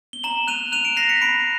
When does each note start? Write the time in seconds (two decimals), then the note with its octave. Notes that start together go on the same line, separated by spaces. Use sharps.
0.13 G7
0.23 A#5 E7 F#7
0.48 F#6 D#7 F7
0.72 F#6 D#7 F7
0.85 D7 E7
0.97 F#6 A#6 C7
1.09 B6 C#7
1.22 B5 C7 D7